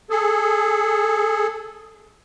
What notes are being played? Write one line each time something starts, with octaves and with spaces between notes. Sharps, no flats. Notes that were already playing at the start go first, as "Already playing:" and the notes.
G#4 A4